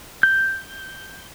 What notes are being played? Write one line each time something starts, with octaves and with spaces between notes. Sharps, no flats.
G6